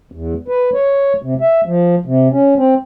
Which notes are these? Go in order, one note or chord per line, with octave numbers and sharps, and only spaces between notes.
E2
B4
C#5
C3
E5
F3
C3
C#4
C4